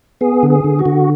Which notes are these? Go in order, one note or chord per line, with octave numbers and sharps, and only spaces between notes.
B3 G#4
D3
G#4
D3
F#4
D3